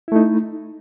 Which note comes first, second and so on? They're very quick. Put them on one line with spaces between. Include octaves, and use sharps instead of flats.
E4 A3 D#4